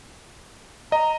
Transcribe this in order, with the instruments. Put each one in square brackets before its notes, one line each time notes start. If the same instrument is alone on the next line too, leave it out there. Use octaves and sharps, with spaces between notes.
[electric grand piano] D#5 [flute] A#5